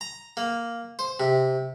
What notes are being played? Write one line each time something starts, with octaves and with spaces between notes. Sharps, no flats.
A#5
A#3
C5
C3